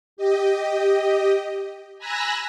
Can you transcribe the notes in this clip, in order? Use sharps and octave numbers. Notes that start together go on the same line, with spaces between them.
G4 D#5
G#5 A#5 B5 E6 F#6 A#6